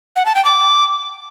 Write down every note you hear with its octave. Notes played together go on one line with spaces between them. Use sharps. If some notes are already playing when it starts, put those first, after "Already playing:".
F#5
A5
G5
D6